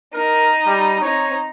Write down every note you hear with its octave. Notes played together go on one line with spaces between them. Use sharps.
D#4 A#4
G3
C4 D#4 C#5